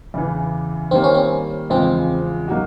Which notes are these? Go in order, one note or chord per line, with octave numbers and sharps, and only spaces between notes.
E2 C#3 E3
D#3 G3 A#3 C4
C#4
C4
E2 C#3 F3 G#3 C4
F#3 A#3 D#4 F#4